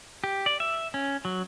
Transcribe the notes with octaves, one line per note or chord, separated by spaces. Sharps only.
G4
D5
E5
C#4
F#3